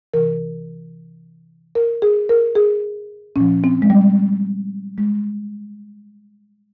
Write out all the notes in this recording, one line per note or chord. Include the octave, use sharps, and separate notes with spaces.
C3 E3 A#4
A#4
G#4
A#4
G#4
A#2 F3 C#4
C4
G#3
G3
G#3